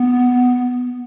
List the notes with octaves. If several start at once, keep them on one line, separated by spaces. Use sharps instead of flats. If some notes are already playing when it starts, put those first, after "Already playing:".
Already playing: B3